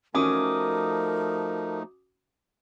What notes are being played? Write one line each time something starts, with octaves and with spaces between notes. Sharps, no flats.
F3 A3 C#4 D#4 F#4 A#4 D6 D#6